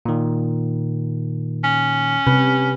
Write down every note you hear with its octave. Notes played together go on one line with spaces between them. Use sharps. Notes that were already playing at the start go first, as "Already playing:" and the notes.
A#2 D#3
C#4
C3 B4